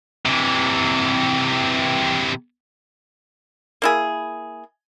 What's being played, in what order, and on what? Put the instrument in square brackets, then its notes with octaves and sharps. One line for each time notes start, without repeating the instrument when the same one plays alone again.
[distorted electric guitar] C3 E3
[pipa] A#3 E4 G#4